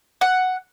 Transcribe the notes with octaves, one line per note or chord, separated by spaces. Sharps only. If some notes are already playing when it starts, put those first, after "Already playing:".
F#5